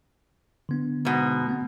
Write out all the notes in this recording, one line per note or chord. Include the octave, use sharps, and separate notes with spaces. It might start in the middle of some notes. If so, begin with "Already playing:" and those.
D3 B3 D4
G#2 B2
A3 B3 C4